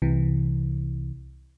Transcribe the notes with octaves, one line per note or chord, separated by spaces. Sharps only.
C2 C3 E3